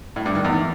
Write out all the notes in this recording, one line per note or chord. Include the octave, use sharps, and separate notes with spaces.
A2
G2
D#3
E2